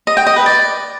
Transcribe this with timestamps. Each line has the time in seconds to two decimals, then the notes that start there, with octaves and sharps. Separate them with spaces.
0.07 D#5
0.17 G5
0.27 D#5
0.36 B4
0.46 D5